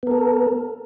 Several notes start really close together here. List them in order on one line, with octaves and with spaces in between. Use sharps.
B3 A#4 A4